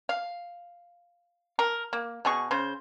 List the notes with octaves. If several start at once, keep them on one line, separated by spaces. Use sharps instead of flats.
F5
A#4
A#3
B2 G#4 C#6
C#3 C5